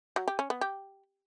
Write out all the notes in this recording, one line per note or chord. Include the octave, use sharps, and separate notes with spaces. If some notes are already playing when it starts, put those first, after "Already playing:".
F#3
G4
C#4
B3
G4